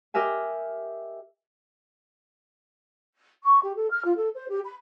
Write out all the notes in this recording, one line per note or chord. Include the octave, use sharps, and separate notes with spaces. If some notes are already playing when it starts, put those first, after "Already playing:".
G4 A#4 D#5 E5 G#5
C#6
G4
A4
F6
F4
A4
C5
G4
B5